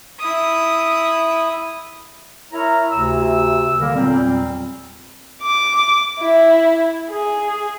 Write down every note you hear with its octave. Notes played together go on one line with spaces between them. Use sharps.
E4 D#6
E4 A#4 C#5 A#5
D2 C3 E6
D3 D#3 G3 A#3 A#4
E2 A#2 F#3 G3 C4
D6
E4
G#4